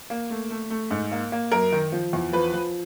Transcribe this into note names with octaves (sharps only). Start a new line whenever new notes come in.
A#3
A3
A3
A3
G#2
A#3
A#3
F#2 A#4
D#3
F3
E2
F3 B4
F3